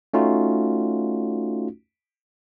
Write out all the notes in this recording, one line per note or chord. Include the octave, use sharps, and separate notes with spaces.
A3 C#4 D#4 F4 F#4